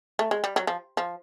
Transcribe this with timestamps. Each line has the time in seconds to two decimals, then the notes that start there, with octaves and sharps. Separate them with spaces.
0.19 A3
0.31 G#3
0.44 G3
0.56 F#3
0.67 F3
0.97 F3